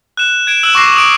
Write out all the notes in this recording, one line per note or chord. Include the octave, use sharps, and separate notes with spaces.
F#6 E7
G#6 D7 E7
E6 F#6 E7 F#7
C#6 D6 F#6 A#6 C7 E7
D#6 D7